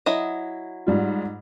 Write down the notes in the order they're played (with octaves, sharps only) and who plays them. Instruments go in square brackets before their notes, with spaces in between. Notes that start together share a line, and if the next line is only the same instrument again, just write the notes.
[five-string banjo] F#3 E4 D#5
[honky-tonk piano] G#2 G3 F4